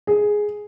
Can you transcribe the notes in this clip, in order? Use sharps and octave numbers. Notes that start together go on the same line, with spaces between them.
G#4